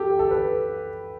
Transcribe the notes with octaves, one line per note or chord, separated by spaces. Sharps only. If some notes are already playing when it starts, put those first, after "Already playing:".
Already playing: G4 A4
A4
B4